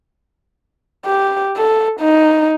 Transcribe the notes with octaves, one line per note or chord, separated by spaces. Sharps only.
G4
A4
D#4